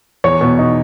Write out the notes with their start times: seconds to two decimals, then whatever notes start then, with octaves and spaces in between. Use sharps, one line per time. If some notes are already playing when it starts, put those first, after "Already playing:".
0.24 E2 C#5
0.41 B2
0.59 D#4